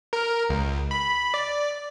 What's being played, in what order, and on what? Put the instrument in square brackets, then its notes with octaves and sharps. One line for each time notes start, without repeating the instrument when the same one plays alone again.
[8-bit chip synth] A#4
C#2
B5
D5